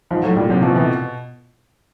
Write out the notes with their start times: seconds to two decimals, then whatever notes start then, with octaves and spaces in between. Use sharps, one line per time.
0.11 G#2 F3
0.23 A2 F#3
0.37 A#2 G3
0.49 C3 F#3
0.63 B2 F3
0.76 B2 E3